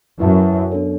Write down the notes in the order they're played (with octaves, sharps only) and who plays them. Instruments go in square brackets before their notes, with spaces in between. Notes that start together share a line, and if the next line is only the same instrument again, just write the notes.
[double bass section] F#2 [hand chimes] E4 B4 E5 A5
[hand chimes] B3 D4 A4 C#5